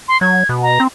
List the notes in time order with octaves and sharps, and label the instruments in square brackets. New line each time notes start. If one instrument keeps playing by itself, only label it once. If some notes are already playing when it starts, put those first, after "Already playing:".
[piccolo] C6
[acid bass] F#3 [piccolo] G#6
[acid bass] B2
[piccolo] A#5
[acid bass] C4